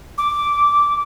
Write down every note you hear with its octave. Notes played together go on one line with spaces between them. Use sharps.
D6